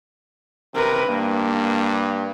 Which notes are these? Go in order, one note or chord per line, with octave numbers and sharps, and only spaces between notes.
C3 A#4 B4
G2 A#3